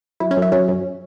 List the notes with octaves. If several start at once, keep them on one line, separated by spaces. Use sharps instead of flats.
F#2 E4
C#4
F#2
E4
F#3 C#4
F#2